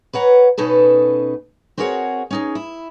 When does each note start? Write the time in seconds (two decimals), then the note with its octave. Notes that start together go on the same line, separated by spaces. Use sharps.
0.13 B4 C#5 F#5 A#5
0.58 B2 C#4 D#4 A4 B4 A5
1.78 C4 F#4 G#4 A#4 C#5 F#5
2.31 C#4 D#4 G#4
2.55 E4